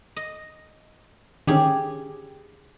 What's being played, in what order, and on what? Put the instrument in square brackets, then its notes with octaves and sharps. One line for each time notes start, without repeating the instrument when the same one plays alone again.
[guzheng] D#5
[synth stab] D3 D#3 C#4 [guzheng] G4 G#4